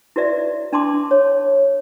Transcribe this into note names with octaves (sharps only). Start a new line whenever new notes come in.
E4 F#4 B4 D5 E5
D4 A5 C6 D6
C#5